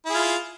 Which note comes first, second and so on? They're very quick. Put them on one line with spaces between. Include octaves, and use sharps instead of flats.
E4 G#4 F4